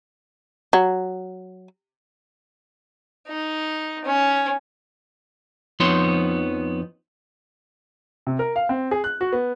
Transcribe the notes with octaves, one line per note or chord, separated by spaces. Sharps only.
F#3
D#4
C#4
F2 F3 B3 D#4 C#5 C6
C3
A#4
F5
C4
G#4
F#6
F#4
B3